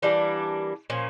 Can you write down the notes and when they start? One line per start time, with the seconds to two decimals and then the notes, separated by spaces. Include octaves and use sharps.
0.02 E3 G3 A#3 D4
0.90 A#2 F3 C#4